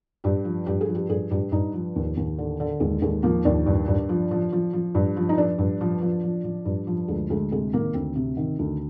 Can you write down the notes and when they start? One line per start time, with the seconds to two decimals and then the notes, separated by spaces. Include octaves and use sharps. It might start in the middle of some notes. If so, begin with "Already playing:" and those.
0.24 G2 G4
0.45 F3
0.66 G2 G4
0.81 G#4
0.88 F3
0.95 G4
1.09 G2 G#4
1.31 G2 G4
1.52 G2 D#4
1.74 F3
1.96 D#2
2.17 D#2
2.38 D3
2.60 D3
2.80 D#2 G#3
3.02 D#2 G#3
3.23 F3 A#3
3.45 D#2 D4
3.66 G2
3.88 G2
4.09 F3
4.31 F3
4.53 F3
4.73 F3
4.95 G2
5.16 F3
5.29 D#4
5.37 F3 D4
5.58 G2
5.81 F3
6.01 F3
6.23 F3
6.44 F3
6.65 G2
6.87 F3
7.08 D2 G#3
7.30 D2 G#3
7.51 C3 G#3
7.73 D#3 A#3
7.94 D2 C4
8.16 C3
8.37 D#3
8.59 D2